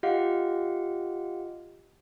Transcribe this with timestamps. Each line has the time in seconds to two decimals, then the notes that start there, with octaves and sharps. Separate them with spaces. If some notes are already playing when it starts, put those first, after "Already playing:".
0.03 F4 G4 D#5 F5 F#5